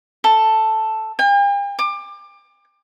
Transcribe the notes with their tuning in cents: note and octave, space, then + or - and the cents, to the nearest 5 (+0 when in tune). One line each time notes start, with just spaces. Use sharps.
A4 +0
G5 +45
D6 +25